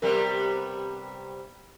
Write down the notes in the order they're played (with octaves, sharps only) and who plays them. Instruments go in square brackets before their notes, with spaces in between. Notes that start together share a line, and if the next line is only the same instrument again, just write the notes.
[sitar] C3 G3 B3 [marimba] A#4